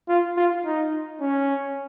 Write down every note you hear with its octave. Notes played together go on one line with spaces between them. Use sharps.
F4
F4
D#4
C#4